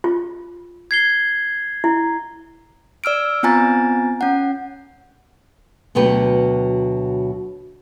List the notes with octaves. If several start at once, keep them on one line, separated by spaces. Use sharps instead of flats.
F4
G#6 C7 G7
E4
D5 E6 F6 D7
B3 C4 F4 G#5 A#5 A6
C#4 F#5
D2 B2 F#3 G4 B4